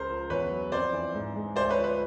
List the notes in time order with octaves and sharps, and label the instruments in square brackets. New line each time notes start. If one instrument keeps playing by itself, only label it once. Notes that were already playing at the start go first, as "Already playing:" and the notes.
Already playing: [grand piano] C#2 A#4 C5
F3
E2 B4 C#5
F#3
F2 C5 D5
E3
G#2
G#3
D2 C5 D5
B4 C#5
F3
B4 C#5